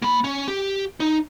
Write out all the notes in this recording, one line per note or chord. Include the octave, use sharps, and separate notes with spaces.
A#3 B5
C#4
G4
D#4